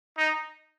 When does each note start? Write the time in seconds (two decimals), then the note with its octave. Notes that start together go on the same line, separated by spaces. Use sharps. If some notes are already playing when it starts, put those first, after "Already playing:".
0.17 D#4